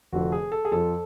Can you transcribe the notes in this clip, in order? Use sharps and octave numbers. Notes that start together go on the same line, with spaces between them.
F1 F2 D3 F3 F#4
G#4
A4
G#4
F2 F3 A4